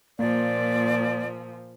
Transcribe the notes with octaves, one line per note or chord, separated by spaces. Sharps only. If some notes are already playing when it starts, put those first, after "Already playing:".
A#2 F3 A#3 D5